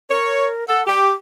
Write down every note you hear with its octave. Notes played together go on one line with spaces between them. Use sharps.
A#4 C#5
A4 F#5
G4 D6